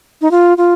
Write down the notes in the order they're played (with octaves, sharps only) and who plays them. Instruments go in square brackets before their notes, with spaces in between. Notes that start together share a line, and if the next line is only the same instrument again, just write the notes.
[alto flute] D#4
F4
F4